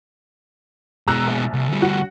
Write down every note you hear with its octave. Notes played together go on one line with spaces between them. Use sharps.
B2 G#3 A#5 E6 F#6
A#1
C2
D2 G3
F#4